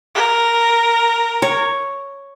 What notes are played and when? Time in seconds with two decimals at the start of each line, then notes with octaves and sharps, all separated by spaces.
0.15 A#4
1.42 C#5